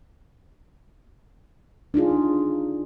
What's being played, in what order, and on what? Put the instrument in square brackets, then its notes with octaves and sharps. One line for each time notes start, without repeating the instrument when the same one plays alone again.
[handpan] D4 D#4 F4 G#4